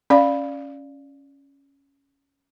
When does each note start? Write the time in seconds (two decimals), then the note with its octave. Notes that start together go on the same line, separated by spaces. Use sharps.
0.10 C#4 D5 F5